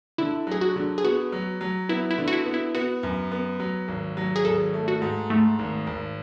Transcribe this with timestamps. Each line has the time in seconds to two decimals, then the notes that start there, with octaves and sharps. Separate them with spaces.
0.18 D3 E4
0.47 F#3 G#4
0.61 F#4
0.76 D3
0.98 G#4
1.04 B3 F#4
1.32 F#3
1.61 F#3
1.89 B3 E4
2.10 E4
2.18 D3
2.28 F#4
2.33 E4
2.46 B3
2.54 E4
2.75 B3 F#4
3.03 F#2
3.31 B3
3.60 F#3
3.88 G#1
4.17 F#3
4.36 G#4
4.45 G#1 A4
4.74 A3
4.88 F#4
5.02 G#2
5.30 G#2 A3
5.59 G#1
5.87 G#1